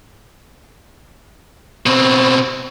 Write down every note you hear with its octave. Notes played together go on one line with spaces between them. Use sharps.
B2 C4